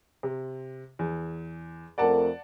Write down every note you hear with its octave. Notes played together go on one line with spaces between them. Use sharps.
C3
E2
F2 A3 A#4 D5 F#5 A5